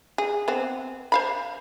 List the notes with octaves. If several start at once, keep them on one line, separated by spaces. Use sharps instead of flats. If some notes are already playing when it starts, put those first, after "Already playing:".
G#4
B3 C4
C5 F5 B5